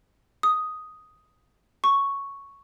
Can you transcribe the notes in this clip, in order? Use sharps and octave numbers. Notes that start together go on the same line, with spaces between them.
D#6
C#6